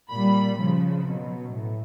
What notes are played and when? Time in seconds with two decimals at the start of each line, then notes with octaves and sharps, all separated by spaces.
0.10 A#2 G3 B5
0.58 C#3 F3
1.05 B2 F#3
1.54 A2